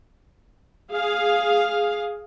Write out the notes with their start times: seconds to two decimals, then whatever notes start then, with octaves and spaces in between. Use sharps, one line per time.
0.92 G#4 F5